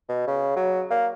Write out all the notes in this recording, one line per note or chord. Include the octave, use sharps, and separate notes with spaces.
B2
C#3
F#3
A#3